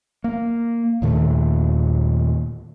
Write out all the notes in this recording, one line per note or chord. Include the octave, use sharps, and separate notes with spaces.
A#3
D#2 A#2 D#3 A3